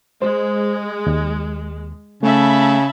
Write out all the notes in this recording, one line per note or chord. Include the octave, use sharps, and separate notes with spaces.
G#3 C5
D#2
C#3 A3 E5 A5 B5